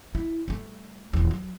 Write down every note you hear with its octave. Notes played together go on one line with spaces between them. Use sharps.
E4
G3 A3
D#1 E2
F#3